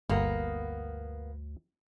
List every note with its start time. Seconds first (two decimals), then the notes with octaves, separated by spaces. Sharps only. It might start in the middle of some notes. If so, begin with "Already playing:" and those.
0.09 G1 D2 A#3 B3